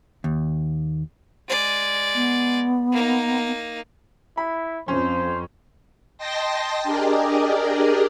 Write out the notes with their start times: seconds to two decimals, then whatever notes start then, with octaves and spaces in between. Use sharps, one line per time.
0.24 D#2
1.48 G#3 D5
2.15 B3
2.92 A#3 D#4
4.37 E4 B5
4.88 F2 C#4 C5
6.18 D#5 G5 A5 C6 A#6
6.83 D4 G4 G#4 A#4 D5 D#5